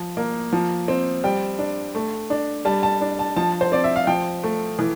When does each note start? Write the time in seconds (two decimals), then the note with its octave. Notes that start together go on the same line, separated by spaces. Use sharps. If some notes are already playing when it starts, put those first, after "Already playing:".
Already playing: F3
0.17 A#3
0.53 F3
0.88 C4
1.24 G3 G5
1.59 D4
1.95 A3
2.30 D4
2.65 G3 A5
2.83 A5
3.01 D4
3.19 A5
3.36 F3 A5
3.61 C5
3.72 C4 D5
3.84 E5
3.96 F5
4.07 F3 G5
4.43 A3
4.79 E3